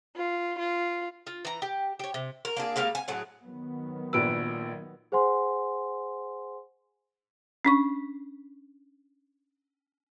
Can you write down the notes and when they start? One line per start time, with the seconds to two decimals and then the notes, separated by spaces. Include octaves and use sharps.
0.16 F4
0.58 F4
1.27 F4
1.45 E3 A#5
1.62 G4
1.99 G4 C#5
2.14 C3
2.45 A#4
2.57 A#3 D4 G#4
2.76 G3 G#3 A#3 F5
2.95 G#5
3.08 A2 F#3 G#4
3.43 D#3 F#3 B3
4.13 A#1 A#2 B4 E6 D7
5.12 G#4 C5 F#5 G#5 C6
7.65 C#4 D4 C#6